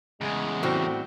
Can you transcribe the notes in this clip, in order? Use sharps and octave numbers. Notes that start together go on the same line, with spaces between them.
E2 C#3 G#3
A2 G3 C4 F#4